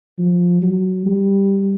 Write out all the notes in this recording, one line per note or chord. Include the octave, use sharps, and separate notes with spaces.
F3
F#3
G3